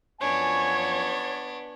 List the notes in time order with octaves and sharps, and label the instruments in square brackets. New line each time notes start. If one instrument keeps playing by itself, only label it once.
[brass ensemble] F#2 F3 G#5 [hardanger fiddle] B3 D4 [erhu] C#5